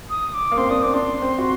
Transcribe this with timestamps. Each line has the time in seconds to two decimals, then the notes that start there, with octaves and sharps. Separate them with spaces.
0.10 D#6
0.34 D6
0.52 A#3
0.57 C4 C6
0.70 D4 D#6
0.82 C4 D6
0.94 D4 C6
1.22 C4
1.38 F#4